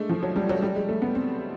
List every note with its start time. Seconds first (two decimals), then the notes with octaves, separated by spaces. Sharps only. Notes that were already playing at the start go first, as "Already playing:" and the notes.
Already playing: G#3 A3 D4
0.09 F3
0.23 F#3
0.36 G3
0.49 F#3
0.62 G3
0.75 G#3
0.89 A3
1.02 B3
1.15 C4